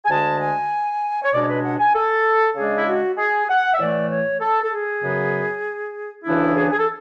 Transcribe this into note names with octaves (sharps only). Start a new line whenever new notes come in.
G#5
D2 D3 G#3 A5
G#5
C#5
C#2 B2 G#3 D4 D5
C#5
B4
F#5
G#5
A4
C#3 G#3 D4 G#4
E4
F#4
G#4
F#5
E5
A2 E3 A3 D5
C#5
A4
A4
G#4
F#2 C#3 F#3 B3
D2 C#3 E3 B3 D4 E4
G#4
G#4
A4